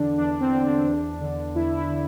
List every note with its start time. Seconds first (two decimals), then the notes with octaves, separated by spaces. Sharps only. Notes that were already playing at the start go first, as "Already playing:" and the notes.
Already playing: E2 D3 D4
0.18 E2 D4
0.40 C4
0.53 D3
0.64 D4
0.87 E2
1.20 D3
1.55 E2 E4
1.77 E4
1.89 D3